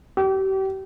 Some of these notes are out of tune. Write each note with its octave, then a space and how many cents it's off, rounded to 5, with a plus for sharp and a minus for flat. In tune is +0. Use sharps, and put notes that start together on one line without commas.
G4 -35